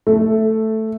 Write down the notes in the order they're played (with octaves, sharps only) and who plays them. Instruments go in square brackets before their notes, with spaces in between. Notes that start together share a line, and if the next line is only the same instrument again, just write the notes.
[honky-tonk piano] A3